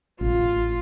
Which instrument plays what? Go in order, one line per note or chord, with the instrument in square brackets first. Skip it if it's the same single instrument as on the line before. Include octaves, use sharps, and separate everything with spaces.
[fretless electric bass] A1 [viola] F4